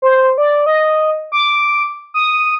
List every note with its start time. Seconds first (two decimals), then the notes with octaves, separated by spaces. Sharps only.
0.02 C5
0.38 D5
0.66 D#5
1.32 D6
2.14 D#6